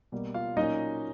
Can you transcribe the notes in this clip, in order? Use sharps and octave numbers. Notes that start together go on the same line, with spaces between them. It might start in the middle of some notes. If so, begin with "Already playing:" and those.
B2 G3 A#3
F4 F5
A#2 F#3 A#3 C#4 D#4 D#5